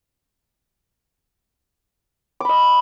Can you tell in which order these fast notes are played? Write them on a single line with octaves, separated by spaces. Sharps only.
D6 B5 D#5